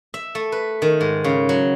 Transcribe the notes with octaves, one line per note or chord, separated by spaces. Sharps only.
E5
A3
B4
D#3
G#2
C#3
F#3